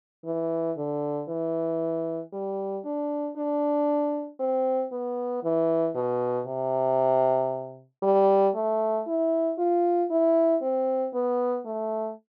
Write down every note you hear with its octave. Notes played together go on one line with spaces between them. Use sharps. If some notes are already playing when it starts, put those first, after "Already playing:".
E3
D3
E3
G3
D4
D4
C4
B3
E3
B2
C3
G3
A3
E4
F4
E4
C4
B3
A3